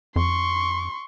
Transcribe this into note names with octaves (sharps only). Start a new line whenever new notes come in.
F2 C6 C#6